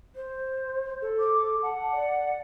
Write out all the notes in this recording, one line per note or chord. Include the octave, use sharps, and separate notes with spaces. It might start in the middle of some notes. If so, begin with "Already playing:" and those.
C5
A4
D6
F#5 A5
D5